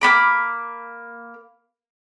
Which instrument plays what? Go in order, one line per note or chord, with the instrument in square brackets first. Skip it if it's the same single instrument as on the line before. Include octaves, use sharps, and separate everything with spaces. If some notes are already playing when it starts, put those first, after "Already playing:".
[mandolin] A#3 B3 B5 D6